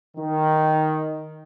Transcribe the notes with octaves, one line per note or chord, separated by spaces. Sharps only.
D#3